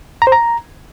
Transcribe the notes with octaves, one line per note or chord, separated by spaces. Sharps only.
A#5
C5
A#5